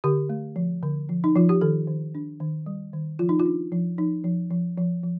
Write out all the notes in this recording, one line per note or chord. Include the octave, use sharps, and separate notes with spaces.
D3 G4
A3
F3
D3
F3
D#4
F3 F4
G4
D#3 A4
D#3
D4
D#3
G3
D#3
F3 F4
D#4
F4
D4
F3
F3 D#4
F3
F3
F3
F3